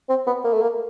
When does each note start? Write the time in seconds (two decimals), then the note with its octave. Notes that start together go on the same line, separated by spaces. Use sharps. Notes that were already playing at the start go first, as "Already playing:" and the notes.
0.09 C4
0.27 B3
0.44 A#3
0.53 A3
0.62 A#3